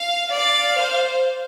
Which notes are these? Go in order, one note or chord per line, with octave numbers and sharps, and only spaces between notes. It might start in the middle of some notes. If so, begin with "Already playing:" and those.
Already playing: F5
D5 F5
C5